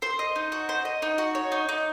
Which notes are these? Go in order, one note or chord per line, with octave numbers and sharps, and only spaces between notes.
C5
D#5
D#4
F#4
C5
D#5
D#4
F#4
C#5
D#4
D#4